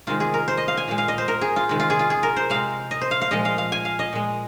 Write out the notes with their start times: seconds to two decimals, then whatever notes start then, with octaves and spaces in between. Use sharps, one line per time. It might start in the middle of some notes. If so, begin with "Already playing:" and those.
0.07 C3 D#3 G#3 F4
0.20 G#4
0.34 A#4
0.48 C5
0.57 D#5
0.68 F5
0.77 G#5
0.88 A#2 G#3 F5
0.98 F5
1.08 D#5
1.18 C5
1.28 A#4
1.41 G#4
1.56 F4
1.69 C3 D#3 G#3
1.80 F4
1.90 G#4
1.99 F4
2.10 G#4
2.23 A#4
2.36 C5
2.50 C3 G#3 F5
2.91 D#5
3.01 C5
3.11 F5
3.21 F5
3.31 A#2 F3 G#3 D#5
3.45 F5
3.58 F5
3.72 G#5
3.85 F5
3.99 D#5
4.13 A#2 G#3